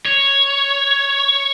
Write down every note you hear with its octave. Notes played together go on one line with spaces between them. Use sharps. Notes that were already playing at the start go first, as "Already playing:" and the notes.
C#5